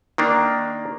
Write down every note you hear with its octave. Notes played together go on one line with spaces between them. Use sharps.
D#3 A#3 D4